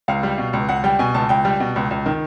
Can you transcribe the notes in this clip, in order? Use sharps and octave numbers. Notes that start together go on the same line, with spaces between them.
C#2 F5
G3
B2
C#2
C#2 F#5
G3 G5
B2 G#5
C#2 A5
C#2 G5
G3
B2
C#2
C#2
D#3